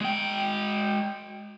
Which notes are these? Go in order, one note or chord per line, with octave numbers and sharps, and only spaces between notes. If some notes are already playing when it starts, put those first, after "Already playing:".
G#3 G5